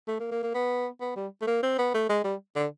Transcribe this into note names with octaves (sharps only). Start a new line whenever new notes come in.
A3
A#3
A#3
A#3
B3
B3
G3
A3
A#3
C4
B3
A3
G#3
G3
D3